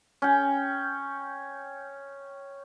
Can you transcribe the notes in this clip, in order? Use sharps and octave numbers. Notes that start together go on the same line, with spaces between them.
C#4 G5